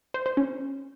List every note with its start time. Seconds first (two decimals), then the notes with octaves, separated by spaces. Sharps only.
0.14 C5
0.26 C5
0.37 C#4